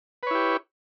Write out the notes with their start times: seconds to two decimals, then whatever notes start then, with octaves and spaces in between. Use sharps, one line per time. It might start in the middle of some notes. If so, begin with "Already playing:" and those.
0.23 B4
0.27 C#5
0.31 E4
0.35 G4